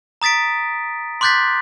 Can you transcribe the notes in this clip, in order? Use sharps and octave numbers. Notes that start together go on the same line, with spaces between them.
A#5 D#6 A6 B6 D7
C6 D6 F#6 G6 A6 B6